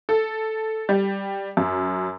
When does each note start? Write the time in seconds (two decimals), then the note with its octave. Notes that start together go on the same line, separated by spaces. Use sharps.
0.09 A4
0.89 G3
1.57 F#2